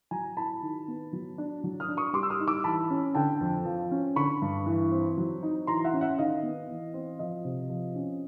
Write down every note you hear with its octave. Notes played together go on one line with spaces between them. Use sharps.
F#3 G#5 A#5
E4 A5 B5
D#3
B3
F#3
D4
F#3
D#6 F6
D4
C#6 D#6
G3 C6 D6
E6
D#6 F6
D#4
D6 E6
E3 A5 B5
C#4
D3 G5 A5
F2
F3
C#4
D3 B5 C#6
G2
E3
C4
F#3
D#4
E3 A#5 C6
E5 F#5
C#4
E5 F#5
D#3 D#5 F5
B3
E3
C4
F3 D#5
C3
F3
C#4